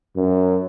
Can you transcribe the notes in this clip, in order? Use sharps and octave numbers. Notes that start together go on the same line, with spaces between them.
F#2